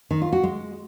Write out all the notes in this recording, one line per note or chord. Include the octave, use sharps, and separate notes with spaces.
D#3
F4
F#4
G#3